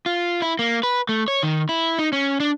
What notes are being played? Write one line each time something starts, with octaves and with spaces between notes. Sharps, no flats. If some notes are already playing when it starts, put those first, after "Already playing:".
F4
E4
A#3
B4
A3
C#5
D#3
E4
D#4
C#4
D4